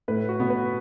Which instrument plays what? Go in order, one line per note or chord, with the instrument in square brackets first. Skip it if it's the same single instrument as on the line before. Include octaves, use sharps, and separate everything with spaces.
[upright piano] A2 A3 [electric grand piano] B4
[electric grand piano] F#4
[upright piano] B2 B3
[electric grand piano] B4